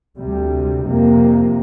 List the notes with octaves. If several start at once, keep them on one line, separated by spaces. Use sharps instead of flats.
D2 C3 G3
F2 C3 A#3